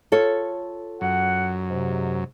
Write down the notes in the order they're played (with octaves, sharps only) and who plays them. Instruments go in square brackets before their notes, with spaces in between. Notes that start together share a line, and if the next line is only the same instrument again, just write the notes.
[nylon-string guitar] F4 A4 C#5
[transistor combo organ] F#2 [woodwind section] F#5
[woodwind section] G#2 C3